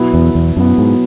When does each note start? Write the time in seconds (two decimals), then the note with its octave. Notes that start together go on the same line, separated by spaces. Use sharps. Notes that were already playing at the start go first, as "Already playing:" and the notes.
Already playing: B2 F#3 B3 E4
0.14 E2
0.35 E2
0.56 F#2 B2 F#3 B3 E4
0.78 G#2